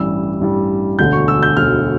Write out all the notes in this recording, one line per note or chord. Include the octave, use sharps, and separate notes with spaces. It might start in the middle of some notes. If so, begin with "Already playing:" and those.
Already playing: A1 G2 E3 G3 E6
A1 G2 E3 G3
E1 D2 D3 G6
C#6
E6
G6
E1 D2 D3 F6